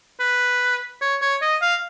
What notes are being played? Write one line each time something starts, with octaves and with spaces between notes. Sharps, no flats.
B4
C#5
C#5
D#5
F5